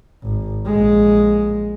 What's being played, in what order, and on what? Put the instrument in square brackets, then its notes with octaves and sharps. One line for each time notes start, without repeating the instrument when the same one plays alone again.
[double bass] G#1
A#1 G#3